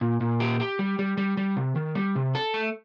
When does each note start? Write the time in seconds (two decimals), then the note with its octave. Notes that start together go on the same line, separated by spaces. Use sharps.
0.01 A#2
0.21 A#2
0.40 G4
0.60 G4
0.79 G3
0.99 G3
1.18 G3
1.37 G3
1.56 C3
1.76 D#3
1.95 G3
2.15 C3
2.35 A4
2.54 A3